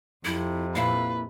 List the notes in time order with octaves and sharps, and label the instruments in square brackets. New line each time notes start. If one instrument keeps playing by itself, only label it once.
[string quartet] F2 C3 [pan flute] E4
[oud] A#2 E4 [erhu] B4 [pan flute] F5